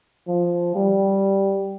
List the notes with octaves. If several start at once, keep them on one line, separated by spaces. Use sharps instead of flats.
F3
G3